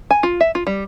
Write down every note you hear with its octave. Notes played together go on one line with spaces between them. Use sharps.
G#5
F4
E5
F4
G3